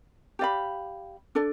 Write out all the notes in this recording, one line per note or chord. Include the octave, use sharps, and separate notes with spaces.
G4 D5 F5 B5
D4 A4 D5